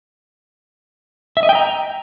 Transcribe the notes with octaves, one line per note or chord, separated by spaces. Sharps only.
E5
D#5
G5
A#5